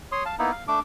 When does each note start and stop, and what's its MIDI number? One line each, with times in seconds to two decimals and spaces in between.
0.12 0.23 73
0.12 0.23 84
0.12 0.23 87
0.26 0.35 77
0.26 0.35 81
0.39 0.51 58
0.39 0.51 59
0.39 0.51 63
0.39 0.51 64
0.52 0.64 77
0.68 0.80 57
0.68 0.80 62
0.68 0.80 86